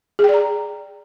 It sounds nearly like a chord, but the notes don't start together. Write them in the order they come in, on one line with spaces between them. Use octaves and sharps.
G#4 G5 D5 A#5